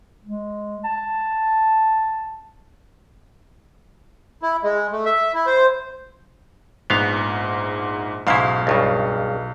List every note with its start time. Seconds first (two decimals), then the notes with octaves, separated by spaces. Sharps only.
0.24 G#3
0.84 A5
4.43 E4
4.63 G#3
4.92 A3
5.06 E5
5.34 E4
5.46 C5
6.90 A#1 G#2 B3 F5
8.27 B1 G#2 C#3 E4 F5 C7
8.67 C#2 G2 C#3